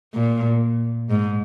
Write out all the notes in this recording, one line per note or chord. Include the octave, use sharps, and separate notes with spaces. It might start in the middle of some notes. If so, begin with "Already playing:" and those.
A#2
G#2